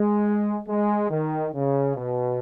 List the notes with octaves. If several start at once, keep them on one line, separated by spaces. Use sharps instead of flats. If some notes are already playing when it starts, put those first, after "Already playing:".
Already playing: G#3
G#3
D#3
C#3
B2